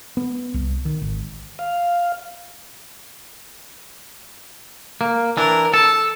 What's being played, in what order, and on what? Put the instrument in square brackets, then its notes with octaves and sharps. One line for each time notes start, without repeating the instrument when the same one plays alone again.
[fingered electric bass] B3
C2
D#3
G#1
[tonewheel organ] F5
[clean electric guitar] A#3
[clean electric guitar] E3 D4 [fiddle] A#4
[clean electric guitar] A4 [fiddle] A5